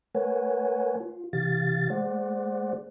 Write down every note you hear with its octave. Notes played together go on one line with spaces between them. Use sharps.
A3 A#4 B4 C#5 F#5 G#5
F4
C3 E3 G4 F5 A6
G#3 A3 G#4 C5 D5 F#5